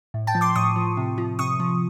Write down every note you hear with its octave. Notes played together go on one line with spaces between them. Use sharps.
A2
G5 A5
F3
C6 D6
A2 C#6 D#6
F3
C3
F3
C3 C#6 D#6
F3